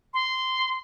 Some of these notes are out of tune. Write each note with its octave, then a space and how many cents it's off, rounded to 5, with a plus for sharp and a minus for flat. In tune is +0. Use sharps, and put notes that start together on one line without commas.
C6 -10